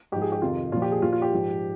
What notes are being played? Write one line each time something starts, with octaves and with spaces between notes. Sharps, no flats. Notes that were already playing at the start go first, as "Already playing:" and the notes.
G#2 F3 G4
G#4
G4
F2 C3 D#3 F4
A#2 F3 F4
G4
G#4
A#2 F3 F4
F4
G4
G#2 F3